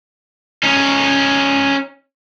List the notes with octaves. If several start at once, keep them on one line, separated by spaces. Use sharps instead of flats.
C#4 D#4